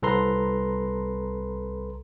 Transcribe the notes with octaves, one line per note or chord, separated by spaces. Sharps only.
C2 A4 B4 A#5 C6